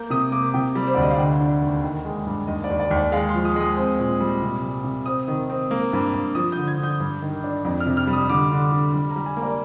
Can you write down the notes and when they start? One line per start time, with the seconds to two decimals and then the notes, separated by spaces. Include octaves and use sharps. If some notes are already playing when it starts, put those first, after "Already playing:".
Already playing: A#3 G6
0.10 C3 D#6
0.32 A#3 D6
0.54 C3 G5
0.75 G3
0.87 C5
0.95 D2 D5
1.02 D#5
1.11 F5
1.18 D3 G5
1.41 D4
1.62 D#2
1.83 D#3
2.05 G#3
2.26 G2
2.47 D#2 D#5
2.64 D5
2.70 D#2
2.80 D5
2.91 D#2
2.96 D5
3.12 G#3 F5
3.29 C6
3.34 F3
3.45 D#6
3.56 G#3 D#6
3.77 C4
3.99 A#2
4.20 G3
4.42 C3
4.63 G3
4.84 C3
5.06 C4 D#6
5.28 D#3
5.50 C4
5.71 A#3
5.93 G2
6.14 G2
6.35 F3 D#6
6.52 D3 G6
6.68 G#6
6.79 D3 G6
7.00 G2
7.22 D#3
7.44 D4
7.65 F2
7.80 F6
7.86 C3
7.97 F6
8.07 G3
8.13 D#6
8.29 D3 D6
8.52 D3
8.72 D3
8.94 G3
9.10 A#5
9.16 G3
9.26 G#5
9.37 A#3
9.43 D5